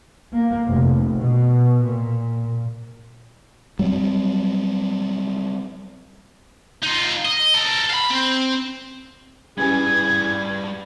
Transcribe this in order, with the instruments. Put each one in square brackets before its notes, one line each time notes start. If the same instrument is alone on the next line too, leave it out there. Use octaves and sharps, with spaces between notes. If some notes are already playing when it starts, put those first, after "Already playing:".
[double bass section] A#3
F1
B2
A#2
[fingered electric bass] F#3 G3 A#3 C4
[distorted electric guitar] D#4 F4
D#5
A4 A#4
F5 B5
C4
[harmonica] E3 G#4 [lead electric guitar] G3 B4 [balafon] C#4 G4 G#5 [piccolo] G#6